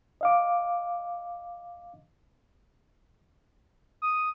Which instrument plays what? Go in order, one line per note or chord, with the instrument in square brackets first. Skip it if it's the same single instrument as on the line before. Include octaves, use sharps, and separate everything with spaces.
[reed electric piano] D#5 F5 D6
[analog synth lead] D#6